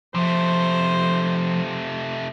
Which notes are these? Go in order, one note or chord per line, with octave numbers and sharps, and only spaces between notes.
C3 F3 A3 C5